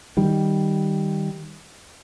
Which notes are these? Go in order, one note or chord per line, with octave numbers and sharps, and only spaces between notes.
D#3 G3